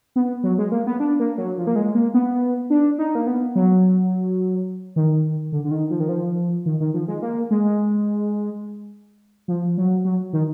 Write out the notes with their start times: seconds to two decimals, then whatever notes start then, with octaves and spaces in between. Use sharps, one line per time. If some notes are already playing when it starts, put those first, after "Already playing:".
0.16 B3
0.44 F#3
0.58 G#3
0.72 A#3
0.87 B3
1.00 D4
1.20 A#3
1.38 F#3
1.58 F3
1.67 A#3
1.76 G#3
1.95 A#3
2.14 B3
2.70 D4
2.98 D#4
3.15 A#3
3.27 B3
3.55 F#3
4.96 D#3
5.52 D3
5.64 D3
5.71 D#3
5.91 F3
6.00 D#3
6.09 F3
6.66 D#3
6.80 D#3
6.94 F3
7.08 G#3
7.22 A#3
7.51 G#3
9.48 F3
9.78 F#3
10.05 F#3
10.33 D#3